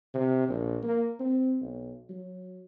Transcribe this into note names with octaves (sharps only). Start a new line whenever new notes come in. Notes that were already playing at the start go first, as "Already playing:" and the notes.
C3
A#1
A#3
C4
B1
F#3